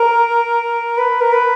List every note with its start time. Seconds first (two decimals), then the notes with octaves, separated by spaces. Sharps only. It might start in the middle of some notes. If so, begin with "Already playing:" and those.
Already playing: A#4
0.97 B4
1.21 A#4
1.32 B4